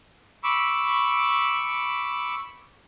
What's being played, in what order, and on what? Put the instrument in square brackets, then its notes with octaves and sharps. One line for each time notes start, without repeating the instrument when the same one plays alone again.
[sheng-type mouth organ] B5 C#6 D6 E6